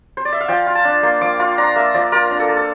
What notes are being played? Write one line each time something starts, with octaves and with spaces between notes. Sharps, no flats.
C5
D5
E5
F5
F3 G5
F4
A5
D4
A#3 C6
F3 D6
F4 C6
D4 A#5
A#3 E5
F3 D5
F4 A#4
D4
A4
A#3
A4